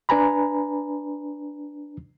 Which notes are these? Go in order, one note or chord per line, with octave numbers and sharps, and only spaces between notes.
D4 B4 G#5 A#5 B5